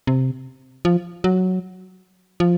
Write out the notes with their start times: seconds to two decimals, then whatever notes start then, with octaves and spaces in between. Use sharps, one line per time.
0.07 C3
0.85 F3
1.24 F#3
2.40 F3